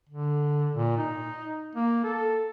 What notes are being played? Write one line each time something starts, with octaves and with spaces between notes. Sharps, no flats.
D3
A#2
D#4
A#3
A4